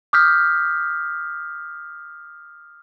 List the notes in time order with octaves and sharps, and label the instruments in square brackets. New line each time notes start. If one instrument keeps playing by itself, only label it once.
[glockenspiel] D6 D#6 F6 G6 B6